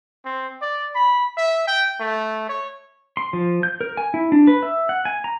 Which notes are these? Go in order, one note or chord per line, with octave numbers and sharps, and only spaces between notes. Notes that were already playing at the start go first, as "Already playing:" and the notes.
C4
D5
B5
E5
G5
A3
C#5
C6
F3
G6
A#4
G#5
E4
D4
B4
E5
F#5
G#5
A#5